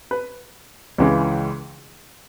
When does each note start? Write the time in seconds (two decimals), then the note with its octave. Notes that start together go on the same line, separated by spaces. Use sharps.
0.11 B4
0.98 C#2 C#3 E3 G#3